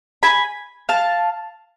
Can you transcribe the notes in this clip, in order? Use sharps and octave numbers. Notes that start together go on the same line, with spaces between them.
G#5 B5
F5 A5